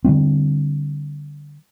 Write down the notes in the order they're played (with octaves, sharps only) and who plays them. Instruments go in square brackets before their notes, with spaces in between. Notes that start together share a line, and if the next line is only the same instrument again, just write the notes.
[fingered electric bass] D3 F3 G3 C4